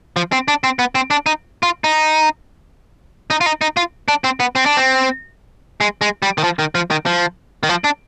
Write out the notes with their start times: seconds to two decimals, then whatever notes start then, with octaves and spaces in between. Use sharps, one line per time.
0.16 F3
0.32 C4
0.48 D4
0.64 C4
0.79 B3
0.95 C4
1.11 D4
1.26 D#4
1.63 F4
1.84 D#4
3.30 D#4
3.41 F4
3.46 D#4
3.61 D#4
3.77 F4
4.08 D4
4.24 C4
4.40 B3
4.55 C4
4.66 D4
4.77 C4
5.81 G#3
6.01 G#3
6.22 G3
6.38 D#3
6.44 F3
6.59 D#3
6.75 F3
6.91 D#3
7.06 F3
7.63 D#3
7.69 F3
7.84 D4